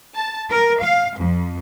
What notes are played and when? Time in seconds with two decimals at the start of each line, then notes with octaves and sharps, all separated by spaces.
0.15 A5
0.50 A#4
0.81 F5
1.19 F2